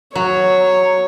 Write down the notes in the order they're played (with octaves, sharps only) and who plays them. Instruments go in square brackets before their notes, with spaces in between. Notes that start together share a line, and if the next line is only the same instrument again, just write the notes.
[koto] F#3 [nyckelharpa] C#5